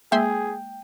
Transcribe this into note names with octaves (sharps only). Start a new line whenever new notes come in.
G#3 A#3 G#4 E5 G5 C6